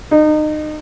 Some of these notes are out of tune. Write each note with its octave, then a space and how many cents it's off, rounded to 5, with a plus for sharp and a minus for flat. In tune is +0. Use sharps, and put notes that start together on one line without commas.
D#4 -30